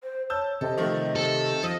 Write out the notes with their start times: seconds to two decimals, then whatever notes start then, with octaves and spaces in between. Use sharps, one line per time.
0.03 C5
0.30 C#5 A5 E6 G6
0.61 C3 A4 D#5
0.78 D#3 F3 A3
1.16 A4
1.63 F3 D#5